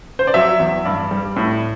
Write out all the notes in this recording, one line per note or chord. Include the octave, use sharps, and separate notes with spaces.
C5
D5
F#3 E5
E2
G2 D5
G3
A2